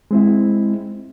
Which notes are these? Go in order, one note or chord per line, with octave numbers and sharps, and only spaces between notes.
G#3 C4 E4